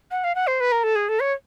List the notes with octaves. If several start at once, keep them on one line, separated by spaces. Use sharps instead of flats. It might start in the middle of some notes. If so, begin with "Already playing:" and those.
F#5
F5
F#5
C5
B4
A#4
A4
G#4
A4
C#5